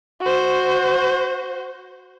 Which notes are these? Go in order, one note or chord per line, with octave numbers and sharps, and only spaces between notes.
F#4 C5